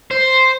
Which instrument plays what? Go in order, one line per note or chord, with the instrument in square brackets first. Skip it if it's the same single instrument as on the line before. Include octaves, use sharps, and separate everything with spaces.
[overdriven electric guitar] C5